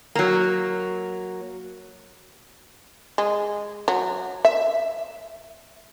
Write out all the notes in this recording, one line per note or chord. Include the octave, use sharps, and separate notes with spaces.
F#3 A#3
G#3
F#3
E5